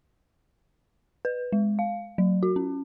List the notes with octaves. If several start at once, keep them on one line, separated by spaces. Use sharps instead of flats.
B4
G#3
F5
F#3
F#4
C#4